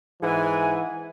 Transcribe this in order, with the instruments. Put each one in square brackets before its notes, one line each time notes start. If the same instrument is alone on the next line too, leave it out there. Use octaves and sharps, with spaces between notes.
[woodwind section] G#2 F#5 G#5 [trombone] E3